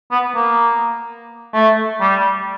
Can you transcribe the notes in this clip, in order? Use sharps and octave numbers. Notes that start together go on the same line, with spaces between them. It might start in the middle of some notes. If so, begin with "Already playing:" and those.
B3
A#3
A3
G3